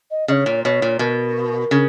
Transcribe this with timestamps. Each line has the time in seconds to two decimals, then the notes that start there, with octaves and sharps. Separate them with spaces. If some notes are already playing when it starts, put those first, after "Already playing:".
0.11 D#5
0.28 C#3 D#5
0.32 C#5
0.46 A#2
0.65 B2 C#5
0.82 A#2
0.99 B2 A#4
1.71 C#3